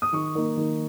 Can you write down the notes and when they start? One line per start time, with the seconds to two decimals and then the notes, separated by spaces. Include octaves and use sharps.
0.02 D#6
0.13 D#3 C#6
0.35 A#3 D#4
0.57 D#3